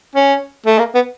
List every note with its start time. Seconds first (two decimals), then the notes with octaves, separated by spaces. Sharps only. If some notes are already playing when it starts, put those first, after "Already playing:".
0.15 C#4
0.66 A3
0.79 A#3
0.95 B3